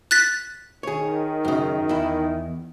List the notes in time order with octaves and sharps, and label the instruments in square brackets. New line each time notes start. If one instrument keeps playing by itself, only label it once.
[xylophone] F#6 A6 B6
[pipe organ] D#3 [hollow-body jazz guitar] G#4 C#5
[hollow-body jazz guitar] F#2 C#3
E2 E4